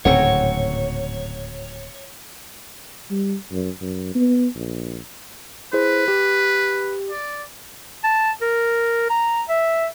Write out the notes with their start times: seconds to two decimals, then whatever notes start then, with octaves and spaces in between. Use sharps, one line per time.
0.05 D1 G#2 C#3 F#3 C4 C#5 F#5
3.10 G3
3.52 F#2
3.81 F#2
4.15 B3
4.56 A#1
5.73 E4 G#4 B4 C5
6.08 G4
7.11 D5
8.04 A5
8.41 A#4
9.10 A#5
9.49 E5